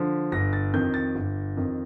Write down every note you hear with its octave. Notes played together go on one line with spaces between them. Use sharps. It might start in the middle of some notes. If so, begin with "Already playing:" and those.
Already playing: D3 F3
G1 A#6
A6
F2 D#3 G6
A6
G1
F2 D#3